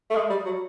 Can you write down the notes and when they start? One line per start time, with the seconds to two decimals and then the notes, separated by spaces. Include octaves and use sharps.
0.10 A3
0.16 G#3
0.30 G3
0.45 F#3